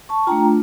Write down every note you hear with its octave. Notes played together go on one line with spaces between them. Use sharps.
A5 C#6
A3 D4 F4 G5 A#5